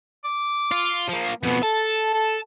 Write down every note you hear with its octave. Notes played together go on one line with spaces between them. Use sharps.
D6
F4
F3 A#3
F2 B2 B3
A4 A5
A4